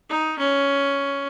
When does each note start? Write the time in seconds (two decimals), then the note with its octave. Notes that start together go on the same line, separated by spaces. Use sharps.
0.09 D#4
0.38 C#4